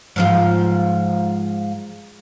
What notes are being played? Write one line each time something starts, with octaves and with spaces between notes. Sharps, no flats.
G#2 F3 F4